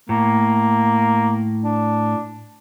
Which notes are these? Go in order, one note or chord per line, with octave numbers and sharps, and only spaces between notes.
A2 A#3
D4